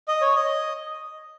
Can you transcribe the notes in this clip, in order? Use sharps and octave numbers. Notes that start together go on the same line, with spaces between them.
D#5
C#5
D#5